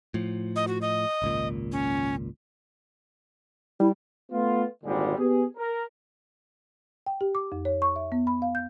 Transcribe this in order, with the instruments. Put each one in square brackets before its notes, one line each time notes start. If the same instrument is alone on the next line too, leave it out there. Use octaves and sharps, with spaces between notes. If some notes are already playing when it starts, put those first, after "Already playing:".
[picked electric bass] A2 F3
[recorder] D#5
F#4
D#5
[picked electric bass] G#1 C#2 A#2
[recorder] C#4
[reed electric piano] G3 [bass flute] E4
[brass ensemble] A3 B3 F4
G#1 A#2 D3 G3 G#3
B3 G4 G#4
A#4
[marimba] G5
G4
D6
F2
C#5
C#6
E5
B3
B5
F5
G6